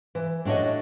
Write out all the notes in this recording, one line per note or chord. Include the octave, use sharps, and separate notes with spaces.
E3
A2 D4 F#4 C#5 D#5